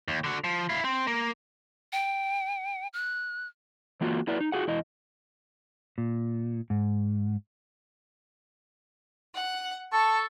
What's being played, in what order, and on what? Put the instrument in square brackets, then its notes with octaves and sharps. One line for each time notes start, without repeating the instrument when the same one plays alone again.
[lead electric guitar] D#2
D3 F#4
F3
E4 F5
C4
A#3
[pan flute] G5
F#6
[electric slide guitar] E3 A#3 F4 F#4
F#3 E4 B4 D5
D#4
F4 F#4 G#4 F#5
E2 E4 D#5
A#2
G#2
[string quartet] F#5
[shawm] A4 [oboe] A5 [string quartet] C#6